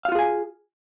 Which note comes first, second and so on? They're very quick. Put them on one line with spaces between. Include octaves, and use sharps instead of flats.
F5 F#4 F4 G#4 G#5